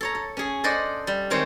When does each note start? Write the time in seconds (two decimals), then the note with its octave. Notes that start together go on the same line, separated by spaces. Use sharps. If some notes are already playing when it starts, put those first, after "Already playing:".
0.01 A4 C#5 A#5
0.15 A4
0.37 C#4 G#4
0.64 A4 C5 D5 D#5 F#5
1.07 G3
1.30 D#3 G#3 C4 C5 C#5